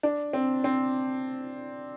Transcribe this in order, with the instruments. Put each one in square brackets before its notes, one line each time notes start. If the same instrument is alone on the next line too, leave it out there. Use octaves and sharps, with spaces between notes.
[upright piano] D4
C4
C4